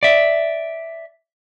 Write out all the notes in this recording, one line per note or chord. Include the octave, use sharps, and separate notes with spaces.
D5 E5